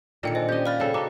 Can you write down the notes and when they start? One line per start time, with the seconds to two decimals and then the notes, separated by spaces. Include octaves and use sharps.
0.23 A#2 D3 D#3 D#5 G5 C#7
0.35 C5 D5 D#5 G#5
0.49 C#4 G4 D5 D#5 G6
0.66 C5 F5 B5 F6 A6
0.80 C#3 A4 G5
0.94 F#4 D#5 A#5 D6